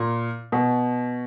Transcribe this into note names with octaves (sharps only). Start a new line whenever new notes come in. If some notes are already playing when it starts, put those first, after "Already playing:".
Already playing: A#2
B2